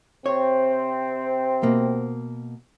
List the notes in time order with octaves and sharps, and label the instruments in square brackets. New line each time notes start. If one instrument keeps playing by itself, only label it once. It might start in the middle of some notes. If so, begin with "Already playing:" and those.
[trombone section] C3 C4 [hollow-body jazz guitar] C#5
[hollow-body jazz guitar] B2 A#3